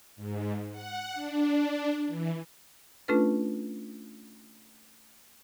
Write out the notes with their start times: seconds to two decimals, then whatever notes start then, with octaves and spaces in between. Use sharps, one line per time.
0.16 G#2
0.71 F#5
1.13 D4
2.07 E3
3.08 A3 C#4 D4 F4 A4 B4